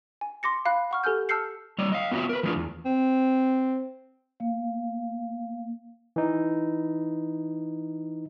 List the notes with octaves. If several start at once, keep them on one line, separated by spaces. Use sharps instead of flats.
G#5
C6 D6 A#6 C#7
F5 B5 F#6
F#5 C#6 F6
G4 A4 G#5 F6 G6
A5 E6 F6 G6 C7 C#7
G3 C#5 D5
D#5 F5
B3 F4 F#4 C#5 E5
A#4 B4
E3 F3 G#3 A3 D4 F4
E2
C4
A#3 F5
E3 D#4